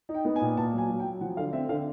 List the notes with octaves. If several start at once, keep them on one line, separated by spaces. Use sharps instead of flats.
D#4
G5
B3
G#5
A#2
A#2 A5
F#3 G#5
F#3
G5
F#3
F3 F#5
D3 F5
C4 E5
D3 F5